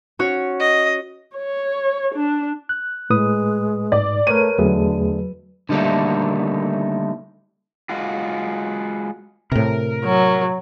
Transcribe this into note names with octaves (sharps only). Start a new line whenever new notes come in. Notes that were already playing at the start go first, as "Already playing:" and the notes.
C#4 F#4 C#5
D#5
C#5
D4
F#6
A2 G#3 B4 D#6
G#2 D5
A3 A#4 B4 C#5 D#7
E2 D3 F#3 A3 G#4 B4
D3 D#3 G3 A3 A#3
G#3 F4 F#4
A2 C3 A#4
F#3